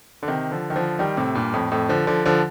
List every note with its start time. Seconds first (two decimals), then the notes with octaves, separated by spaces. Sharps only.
0.23 D3
0.28 C3 D#3
0.52 D3 F3
0.70 D#3
0.76 D3 F3
0.99 D#3 G3
1.17 A2 C3
1.35 G2 A#2
1.53 F2 A2
1.72 F2 A2
1.89 D3 F3
2.07 D3 F3
2.25 D3 F3